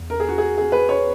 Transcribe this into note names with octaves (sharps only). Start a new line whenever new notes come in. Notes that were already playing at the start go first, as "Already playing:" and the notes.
Already playing: E2
A#4
G#4
F#4
G#4
G#4
B4
C#5